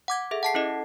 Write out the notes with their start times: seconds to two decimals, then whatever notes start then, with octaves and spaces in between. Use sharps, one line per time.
0.08 F#5 D6 G#6
0.31 G#4 A4 E5
0.43 F#5 A5 C7
0.54 C#4 E4 A4 D#5